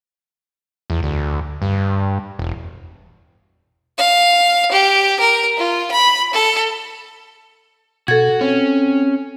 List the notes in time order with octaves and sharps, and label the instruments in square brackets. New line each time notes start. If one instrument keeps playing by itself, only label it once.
[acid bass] E2
D2
G2
E1
[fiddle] F5
G4
A#4
F4
B5
A4
[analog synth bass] B2 [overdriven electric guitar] F#4 [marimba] A4 G#6
[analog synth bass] C4 [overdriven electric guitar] C#4